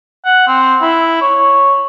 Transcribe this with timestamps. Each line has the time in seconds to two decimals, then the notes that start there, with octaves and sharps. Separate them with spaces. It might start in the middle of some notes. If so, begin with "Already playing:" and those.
0.25 F#5
0.47 C4
0.82 E4
1.21 C#5